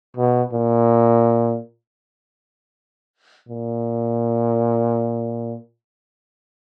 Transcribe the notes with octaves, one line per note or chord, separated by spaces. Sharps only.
B2
A#2
A#2